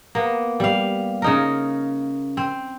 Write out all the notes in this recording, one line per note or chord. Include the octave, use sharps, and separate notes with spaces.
A#3 B3
G3 F5
C#3 D#4 A#4
C4